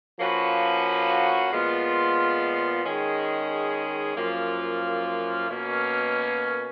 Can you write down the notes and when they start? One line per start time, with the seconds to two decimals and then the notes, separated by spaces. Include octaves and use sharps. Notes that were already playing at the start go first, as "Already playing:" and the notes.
0.19 F3 A#3 C#4 F#4 B4
1.51 A#2 F3 G#3 B3 F4
2.84 D#3 G#3 C#4 G#4
4.16 F#2 F3 A#3 F4
5.49 B2 A#3 C#4